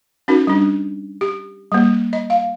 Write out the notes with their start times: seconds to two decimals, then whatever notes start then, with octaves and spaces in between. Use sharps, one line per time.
0.28 C#4 D#4 F#4 A#4
0.47 G3 D4
1.21 G4
1.72 G3 A#3
2.13 D#5
2.30 F5